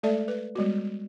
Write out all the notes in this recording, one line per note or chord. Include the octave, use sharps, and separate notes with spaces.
G#3 A3 A4 D5 E5 A5
B4
G3 G#3 B3 F#4